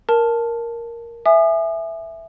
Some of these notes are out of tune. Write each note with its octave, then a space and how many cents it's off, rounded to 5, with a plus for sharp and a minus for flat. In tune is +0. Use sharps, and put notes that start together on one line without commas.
A#4 +0 A5 +0
E5 +0 G#5 +0 D#6 -40